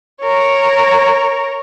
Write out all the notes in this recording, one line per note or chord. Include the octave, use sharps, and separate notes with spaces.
A#4 C#5